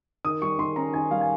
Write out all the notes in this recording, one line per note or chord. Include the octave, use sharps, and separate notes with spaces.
D#3 D#6
G3 C#6
D#3 C6
C#4 A#5
D#3 G#5
G3 F5
G#5